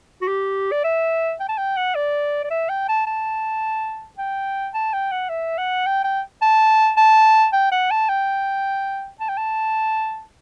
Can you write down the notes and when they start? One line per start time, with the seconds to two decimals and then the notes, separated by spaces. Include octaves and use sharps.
0.21 F#4
0.28 G4
0.72 D5
0.84 E5
1.40 G5
1.49 A5
1.58 G5
1.76 F#5
1.95 D5
2.44 D5
2.50 E5
2.69 G5
2.88 A5
3.06 A5
4.18 G5
4.74 A5
4.93 G5
5.11 F#5
5.29 E5
5.58 F#5
5.86 G5
6.04 G5
6.42 A5
6.97 A5
7.53 G5
7.71 F#5
7.91 A5
8.09 G5
9.20 A5
9.29 G5
9.37 A5